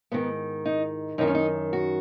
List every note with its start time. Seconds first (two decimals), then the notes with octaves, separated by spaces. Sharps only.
0.12 G#2 D#3 B3
0.65 D#4
1.18 F#2 D#3 D#4
1.27 C#4
1.35 D#4
1.73 F#4